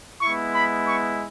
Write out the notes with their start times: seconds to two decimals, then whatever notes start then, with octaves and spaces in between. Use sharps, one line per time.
0.21 G#3 B3 E4 C#6
0.54 B5
0.88 C#6